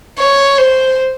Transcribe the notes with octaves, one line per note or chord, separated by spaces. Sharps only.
C#5
C5